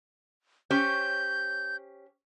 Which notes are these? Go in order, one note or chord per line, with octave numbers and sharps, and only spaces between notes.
C#4 G4 C5 G6